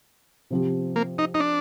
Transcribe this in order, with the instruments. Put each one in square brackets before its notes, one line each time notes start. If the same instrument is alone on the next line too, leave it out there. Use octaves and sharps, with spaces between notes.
[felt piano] C3 F3 C4 G4
[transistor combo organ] A#3
D#4
D#4
D4